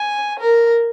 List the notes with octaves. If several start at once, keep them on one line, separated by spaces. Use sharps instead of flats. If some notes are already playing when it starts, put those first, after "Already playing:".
Already playing: G#5
A#4